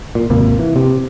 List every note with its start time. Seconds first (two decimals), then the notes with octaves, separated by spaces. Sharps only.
0.15 A#2
0.30 G#1 D#2 C3 A#3
0.59 E3
0.76 C3